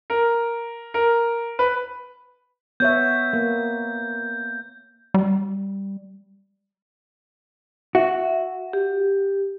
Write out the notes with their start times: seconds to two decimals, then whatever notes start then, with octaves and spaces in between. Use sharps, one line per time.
0.10 A#4
0.94 A#4
1.59 B4
2.80 B3 C#5 E5 G6
3.33 A#3
5.14 G3
7.95 F#4 E5
8.73 G4